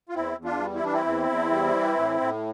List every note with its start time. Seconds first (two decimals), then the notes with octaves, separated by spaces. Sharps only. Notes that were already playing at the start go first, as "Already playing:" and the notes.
0.09 F4
0.15 E2 C4 E4
0.38 E2
0.45 D4 F4
0.60 G3
0.75 E4
0.83 E3 D4
0.93 C4 E4
1.06 E2
1.29 E2
1.52 G3
1.74 E3
1.98 A2
2.21 A2